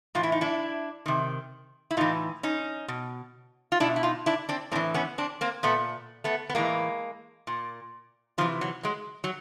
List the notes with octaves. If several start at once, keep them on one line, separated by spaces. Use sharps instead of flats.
A2 E3 F4
E4
D#4
D4 E4
C3 D#3
E4
A2 E3 D#4 F4
C#4 D#4
B2
F4
B2 D4 E4
E4
D#4 F4
D4 E4
C4 D4
A2 E3 C4 D4
B3 C#4
C4 D4
A#3 C4
A#2 A3 B3
A3 B3
B3
A2 E3 G#3 A#3
A#2
C3 E3 F3
F#3
F#3 G#3
F#3